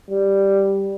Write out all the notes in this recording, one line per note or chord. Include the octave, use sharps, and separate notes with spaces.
G3